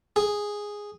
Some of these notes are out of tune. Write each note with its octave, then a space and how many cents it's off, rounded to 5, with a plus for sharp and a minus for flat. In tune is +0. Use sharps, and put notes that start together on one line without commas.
G#4 -5